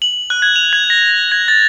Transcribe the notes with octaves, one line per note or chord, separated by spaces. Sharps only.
F#7
F#6
G#6
F7
G#6
A#6
G#6
A6